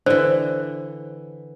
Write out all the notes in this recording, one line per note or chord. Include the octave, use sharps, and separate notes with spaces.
D3 E3 C5